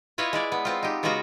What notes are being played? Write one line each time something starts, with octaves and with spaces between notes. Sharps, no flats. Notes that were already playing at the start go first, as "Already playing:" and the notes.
E4 F4 B4 C#5 D#5
G#3 E4 D5
B3
B3 C4 F4
D#4 G4
C#3 G#3 B3 F4 F#4 A#5